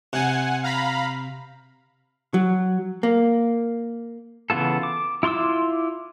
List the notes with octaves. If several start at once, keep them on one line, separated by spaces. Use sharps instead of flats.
C3 F#5 G#5
F5 A#5 B5
F#3
A#3
C#3 E3 B3 F4 A4
D6
E4 F4 C6 D6 E6